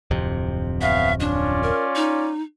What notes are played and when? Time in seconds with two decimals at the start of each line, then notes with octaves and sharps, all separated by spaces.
0.11 D1 F2 C3
0.81 B3 C#4 E5 F5
1.20 C#4 D4 F4 D5
1.63 A#4
1.96 D#4